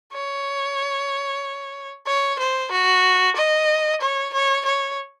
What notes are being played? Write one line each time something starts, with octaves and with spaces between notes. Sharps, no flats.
C#5
C#5
C5
F#4
D#5
C#5
C#5
C#5